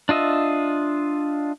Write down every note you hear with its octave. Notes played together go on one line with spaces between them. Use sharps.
D4 F4 D#5 E5